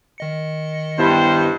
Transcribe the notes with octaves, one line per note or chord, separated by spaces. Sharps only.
D#3 D#5 C#7
G2 B3 E4 C5